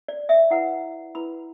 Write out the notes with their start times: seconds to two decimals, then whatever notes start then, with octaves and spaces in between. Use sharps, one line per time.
0.08 D5
0.29 E5
0.50 E4 B4 F#5
1.15 E4 B4 B5